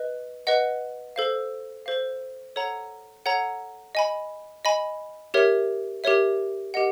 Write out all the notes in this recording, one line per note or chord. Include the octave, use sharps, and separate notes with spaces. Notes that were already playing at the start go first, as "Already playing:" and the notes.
Already playing: B4 D#5
B4 D#5 F#5
A4 C5 F5
A4 C5 F5
A4 C#5 F#5 A#5
A4 C#5 F#5 A#5
D#5 G#5 B5
D#5 G#5 B5
G4 A#4 C#5 E5
G4 A#4 C#5 E5
G4 A#4 D#5 F#5